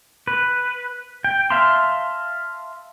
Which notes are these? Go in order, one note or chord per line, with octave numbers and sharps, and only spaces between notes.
B4
G5
E5 F5 A5 A#5 C6